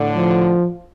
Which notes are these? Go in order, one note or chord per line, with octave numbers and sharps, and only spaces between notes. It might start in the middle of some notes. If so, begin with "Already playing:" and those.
Already playing: A2 D3
F3